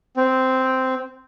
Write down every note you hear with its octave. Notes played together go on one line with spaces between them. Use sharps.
C4